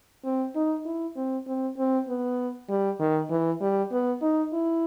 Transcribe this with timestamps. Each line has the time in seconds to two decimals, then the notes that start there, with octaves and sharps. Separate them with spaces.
0.24 C4
0.56 D#4
0.86 E4
1.16 C4
1.47 C4
1.78 C4
2.09 B3
2.69 G3
3.00 D#3
3.30 E3
3.61 G3
3.92 B3
4.22 D#4
4.53 E4